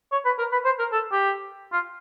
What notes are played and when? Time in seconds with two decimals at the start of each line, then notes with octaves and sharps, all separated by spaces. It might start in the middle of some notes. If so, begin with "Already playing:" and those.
0.12 C#5
0.25 B4
0.38 A#4
0.52 B4
0.65 C5
0.79 A#4
0.92 A4
1.12 G4
1.73 F4